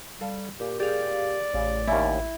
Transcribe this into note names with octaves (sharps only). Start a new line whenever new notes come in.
G3 A4 F5
A#2 G4
G4 G#4 D5 F5
A1 C#3
D#2 C#4 E4